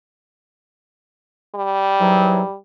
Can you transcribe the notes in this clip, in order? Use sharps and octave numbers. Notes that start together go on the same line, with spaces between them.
G3
G#2 E3 F#3